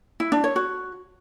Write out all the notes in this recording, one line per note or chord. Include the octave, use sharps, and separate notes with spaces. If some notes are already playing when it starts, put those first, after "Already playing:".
E4
D4
C#5
F#4